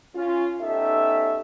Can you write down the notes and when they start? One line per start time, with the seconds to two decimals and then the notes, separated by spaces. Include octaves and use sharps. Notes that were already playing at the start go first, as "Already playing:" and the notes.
0.15 C#4 F4
0.61 B3 C#4 D#4 G4 A4 E5